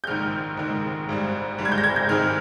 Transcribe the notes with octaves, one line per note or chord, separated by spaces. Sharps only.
G6
A#1 G#2 D#3 F6
A#1 G#2 D#3
G#1 G#2 G3
G#1 G#2 G3
G#6
G6
A#6
G#6
G6
G#2 D#3 G#3 C4 F6